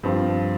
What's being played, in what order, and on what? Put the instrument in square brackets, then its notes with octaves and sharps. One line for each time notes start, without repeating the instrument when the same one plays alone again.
[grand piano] G2 F3 C4 F4